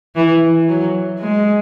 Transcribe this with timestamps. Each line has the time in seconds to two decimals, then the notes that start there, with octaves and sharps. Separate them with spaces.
0.16 E3
0.68 F#3
1.20 G#3